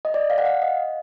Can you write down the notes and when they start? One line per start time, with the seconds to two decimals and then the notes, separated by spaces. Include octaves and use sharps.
0.05 D#5
0.14 D5
0.30 F5
0.38 F#5
0.45 F5
0.62 D#5